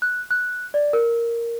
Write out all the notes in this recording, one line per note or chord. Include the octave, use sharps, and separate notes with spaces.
F#6
F#6
D5
A#4